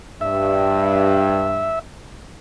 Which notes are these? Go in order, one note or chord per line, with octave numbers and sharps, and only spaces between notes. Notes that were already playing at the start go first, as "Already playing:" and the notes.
G2 E5